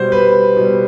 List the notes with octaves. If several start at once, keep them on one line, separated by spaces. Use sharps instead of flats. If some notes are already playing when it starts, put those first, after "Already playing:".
Already playing: B2 G3 C5
B4
B2 G3